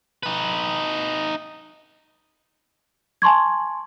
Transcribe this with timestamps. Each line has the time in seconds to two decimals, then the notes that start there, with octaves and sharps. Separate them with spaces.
0.23 D#4 B4
3.22 G#5 A5 C6 C#6 G#6